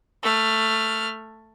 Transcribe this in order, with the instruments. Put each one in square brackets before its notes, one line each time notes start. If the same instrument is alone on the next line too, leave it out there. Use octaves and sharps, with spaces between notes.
[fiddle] A3 F6